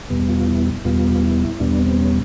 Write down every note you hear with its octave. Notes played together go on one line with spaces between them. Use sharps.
E2 B2 G3 B3
F4
E4
E2 B2 G3 B3 F4
E4
E2 B2 G3 B3 D4
C4
C#4